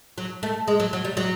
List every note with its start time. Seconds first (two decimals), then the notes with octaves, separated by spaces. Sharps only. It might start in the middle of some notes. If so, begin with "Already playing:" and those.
0.18 F#3
0.43 A3
0.68 G#3
0.80 F#3
0.93 F#3
1.05 G3
1.17 F#3